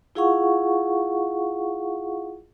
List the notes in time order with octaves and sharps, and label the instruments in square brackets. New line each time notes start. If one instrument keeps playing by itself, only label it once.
[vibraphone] E4 F4 G#4 F5 F#5 C#6